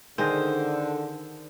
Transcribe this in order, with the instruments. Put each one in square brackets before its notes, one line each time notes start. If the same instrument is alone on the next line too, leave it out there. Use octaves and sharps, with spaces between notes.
[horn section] D3 [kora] D#3 G#4 D#5 [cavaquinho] C5